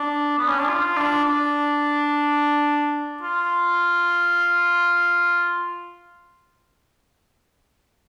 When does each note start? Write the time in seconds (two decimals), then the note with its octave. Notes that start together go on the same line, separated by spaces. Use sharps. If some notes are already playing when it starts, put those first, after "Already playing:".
Already playing: D4
0.38 B3
0.48 C#4
0.59 D4
0.68 F4
0.97 D4
1.25 D4
3.22 F4